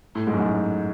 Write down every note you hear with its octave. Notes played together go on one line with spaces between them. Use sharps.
A2
G#2
F#2
G#2